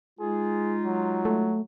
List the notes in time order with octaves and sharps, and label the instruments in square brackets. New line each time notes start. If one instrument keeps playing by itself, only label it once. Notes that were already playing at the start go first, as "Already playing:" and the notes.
[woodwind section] G#3 D#4 F4 [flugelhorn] G#4
[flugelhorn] F#3
[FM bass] A3